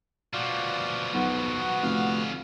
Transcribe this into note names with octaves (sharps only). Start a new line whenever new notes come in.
B2 F3 F4 F#4 D5
B1 B3 F#4
F1 D3 F5